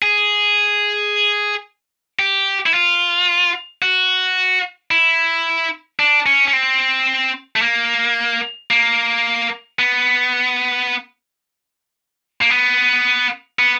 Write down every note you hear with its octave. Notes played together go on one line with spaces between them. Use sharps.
G#4
G4
E4
F4
F#4
E4
D4
C#4
C#4
C4
A3
A#3
A#3
B3
A#3
B3
B3